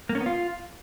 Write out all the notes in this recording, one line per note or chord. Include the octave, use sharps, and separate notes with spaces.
A#3
C#4
B3
F4